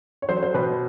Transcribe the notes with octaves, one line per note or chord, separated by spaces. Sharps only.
C#5
F#3 C5
C5
B2 B4